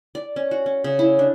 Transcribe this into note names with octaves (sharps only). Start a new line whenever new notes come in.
D5
C#4
F#4
C#4
C#3
E4
D4